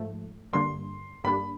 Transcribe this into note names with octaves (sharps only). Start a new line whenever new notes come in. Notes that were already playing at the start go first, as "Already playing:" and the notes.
Already playing: G#2 F3 A3
G2 D3 G3 A#3 D4 C6
G2 D3 G3 A#3 D4 B5